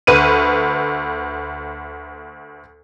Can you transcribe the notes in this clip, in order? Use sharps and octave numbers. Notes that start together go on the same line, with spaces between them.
D2 B4 D#7